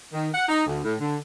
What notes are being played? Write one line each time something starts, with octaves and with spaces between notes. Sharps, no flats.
D#3
F#5
D#4
D2
A2
D3